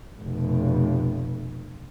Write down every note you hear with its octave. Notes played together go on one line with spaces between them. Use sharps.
F1 B2